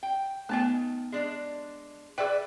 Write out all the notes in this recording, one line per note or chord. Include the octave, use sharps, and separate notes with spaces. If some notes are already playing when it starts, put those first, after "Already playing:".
G5
D#3 A3 B3 G5 A5
G#3 D4
G#4 B4 D5 E5 G5